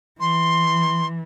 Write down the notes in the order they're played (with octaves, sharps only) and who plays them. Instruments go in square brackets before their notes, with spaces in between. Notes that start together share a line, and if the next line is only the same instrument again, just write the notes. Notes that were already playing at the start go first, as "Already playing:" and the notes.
[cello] E3 [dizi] C6